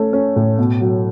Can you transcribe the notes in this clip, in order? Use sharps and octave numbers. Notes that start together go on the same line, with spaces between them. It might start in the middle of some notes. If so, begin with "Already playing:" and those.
Already playing: A3 C#4
C#4
A2
B2
F#3